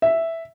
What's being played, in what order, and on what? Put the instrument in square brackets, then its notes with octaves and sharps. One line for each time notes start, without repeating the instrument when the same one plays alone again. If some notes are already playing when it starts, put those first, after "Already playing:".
[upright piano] E5